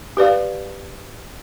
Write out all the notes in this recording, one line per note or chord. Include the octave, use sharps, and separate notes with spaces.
G4 B4 D5 F5